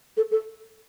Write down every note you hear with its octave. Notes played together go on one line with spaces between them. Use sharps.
A4
A4